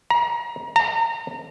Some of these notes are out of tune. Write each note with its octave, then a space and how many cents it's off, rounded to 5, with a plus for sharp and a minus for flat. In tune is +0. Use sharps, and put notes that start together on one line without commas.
A#5 +30
A#5 -30